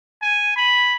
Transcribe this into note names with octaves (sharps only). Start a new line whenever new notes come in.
G#5
B5